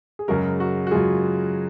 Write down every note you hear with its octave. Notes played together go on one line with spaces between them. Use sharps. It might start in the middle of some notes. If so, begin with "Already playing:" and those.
G#4
F#2 C#3 G#3 F#4 A#4
F#4
F#4
F#2 C#3 G#3 F4 G#4